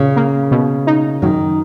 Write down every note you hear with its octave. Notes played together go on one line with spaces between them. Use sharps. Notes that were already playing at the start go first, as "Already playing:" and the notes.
Already playing: A#2 C#3
A#3
B2
D#4
F#2 D#3